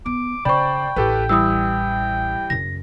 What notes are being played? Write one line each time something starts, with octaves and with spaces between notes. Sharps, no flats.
B3 D6
C#3 C5 D5 G5 B5 C#6
A1 G4 A4 B4
E3 G3 E4 D#6 E6
F#2 C#3 A#6